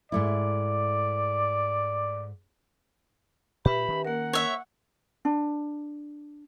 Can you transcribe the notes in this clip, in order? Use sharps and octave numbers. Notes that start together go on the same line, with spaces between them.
G#2 A3 E4 D5
A#2 G4 B4 E5 B5
D#3 C#4
A#3 A#4 F#5
C#5 E5
D4